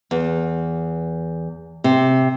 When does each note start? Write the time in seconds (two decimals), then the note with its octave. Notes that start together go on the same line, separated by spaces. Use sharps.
0.11 E2
1.84 C3